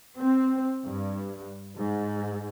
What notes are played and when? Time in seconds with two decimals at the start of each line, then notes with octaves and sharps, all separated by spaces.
0.17 C4
0.84 G2
1.77 G#2